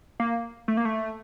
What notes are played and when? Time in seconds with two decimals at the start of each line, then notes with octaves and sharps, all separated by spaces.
0.20 A#3
0.68 A3
0.77 A#3
0.85 A3